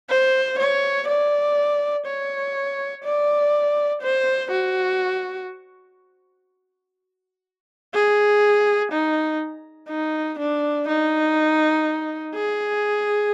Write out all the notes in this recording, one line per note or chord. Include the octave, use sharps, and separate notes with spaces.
C5
C#5
D5
C#5
D5
C5
F#4
G#4
D#4
D#4
D4
D#4
G#4